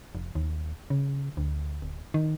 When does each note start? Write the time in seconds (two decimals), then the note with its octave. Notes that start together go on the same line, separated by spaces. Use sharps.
0.15 F1
0.35 D#2
0.90 C#3
1.37 D2
1.82 D1
2.14 D#3